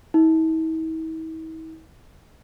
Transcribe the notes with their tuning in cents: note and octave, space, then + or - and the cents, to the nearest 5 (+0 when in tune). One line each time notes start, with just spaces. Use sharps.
E4 -45